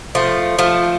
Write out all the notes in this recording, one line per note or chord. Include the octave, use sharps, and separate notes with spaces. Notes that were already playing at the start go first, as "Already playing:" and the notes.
F3 A3
F3 A3